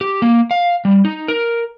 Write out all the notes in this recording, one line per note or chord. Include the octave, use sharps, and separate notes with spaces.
G4
A#3
F5
G3
D#4
A#4